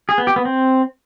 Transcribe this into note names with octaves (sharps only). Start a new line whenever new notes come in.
G#4
B3
G4
B3
C4